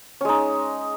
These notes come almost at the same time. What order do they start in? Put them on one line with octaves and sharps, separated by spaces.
C#4 G#3 D#4